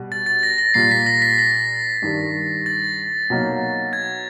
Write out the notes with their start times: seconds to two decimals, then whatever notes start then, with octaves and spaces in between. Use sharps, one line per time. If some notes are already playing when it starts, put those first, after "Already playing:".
Already playing: B2 G3
0.12 A6
0.26 A6
0.43 A#6
0.58 A#6
0.74 A#2 G3 A#3 C7
0.91 B6
1.06 A#6
1.22 B6
1.38 A#6
2.02 G2 D#3 G3
2.66 A6
3.30 B2 F#3 A#3 D#4
3.93 G#6